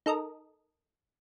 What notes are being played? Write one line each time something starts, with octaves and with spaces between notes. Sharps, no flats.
D#4 A4 A#4 D#5